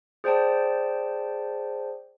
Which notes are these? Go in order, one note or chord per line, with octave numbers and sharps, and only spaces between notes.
G#4 C5 D5 G5 A5